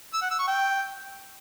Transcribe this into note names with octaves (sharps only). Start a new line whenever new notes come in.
E6
F#5
E6
C#6
G5